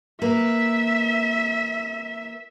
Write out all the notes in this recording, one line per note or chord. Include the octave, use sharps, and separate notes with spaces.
A#3 B4 E5